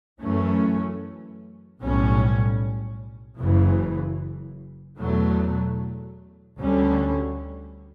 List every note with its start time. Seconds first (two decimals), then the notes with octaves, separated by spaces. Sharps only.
0.22 F#2 E3 A3 C#4
1.81 B1 A2 G3 C#4
3.39 F#1 F#2 C#3 E3
4.98 E2 B2 F#3 A3
6.58 D2 D3 G3 C#4